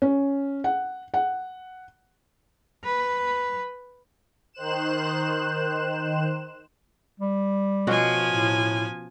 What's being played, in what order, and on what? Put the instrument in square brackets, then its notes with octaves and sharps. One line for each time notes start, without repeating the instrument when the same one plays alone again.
[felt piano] C#4
F#5
F#5
[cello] B4
[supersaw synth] D#3 C5 F#6 E7
[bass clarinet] G3
[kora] B2 C#4 F#4 [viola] F3 G#5
[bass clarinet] A2